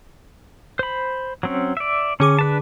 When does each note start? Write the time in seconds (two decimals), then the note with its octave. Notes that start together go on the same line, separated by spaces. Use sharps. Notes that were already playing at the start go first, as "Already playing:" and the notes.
0.79 C5 B5
1.43 F#3 C4 C#4
1.77 D5 E5
2.20 D3 C#4 G#4 D6
2.39 D4 B4 A5